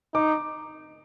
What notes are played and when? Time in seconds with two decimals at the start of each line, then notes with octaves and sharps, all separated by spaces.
0.14 D#4 D6